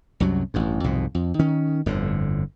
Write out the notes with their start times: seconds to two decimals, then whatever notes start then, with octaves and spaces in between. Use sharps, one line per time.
0.20 C2 F#2 C3 F#3
0.54 A1 G2
0.84 C2 F2 G#2 B2
1.15 F2
1.39 D#3 C#4
1.86 G1 F2 A2 D3